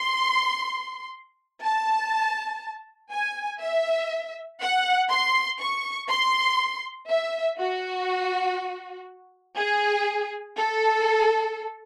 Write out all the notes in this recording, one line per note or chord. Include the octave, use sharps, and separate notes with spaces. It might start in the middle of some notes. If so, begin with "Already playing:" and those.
Already playing: C6
A5
G#5
E5
F#5
C6
C#6
C6
E5
F#4
G#4
A4